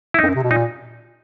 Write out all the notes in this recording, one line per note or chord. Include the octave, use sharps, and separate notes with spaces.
E4
F2 D#4
F#2
C3
B2
A#2 D#4